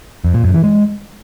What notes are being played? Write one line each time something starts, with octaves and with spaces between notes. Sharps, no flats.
F2
A#2
F#2
E3
G#3